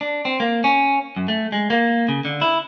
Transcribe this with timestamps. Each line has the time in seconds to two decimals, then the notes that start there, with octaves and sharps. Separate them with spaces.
0.01 D4
0.25 C4
0.40 A#3
0.64 C#4
1.16 F#2
1.28 A3
1.52 G#3
1.70 A#3
2.09 C#3
2.25 D3
2.42 E4